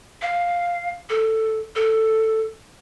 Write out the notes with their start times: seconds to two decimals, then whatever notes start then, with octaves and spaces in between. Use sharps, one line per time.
0.22 F5
1.10 A4
1.76 A4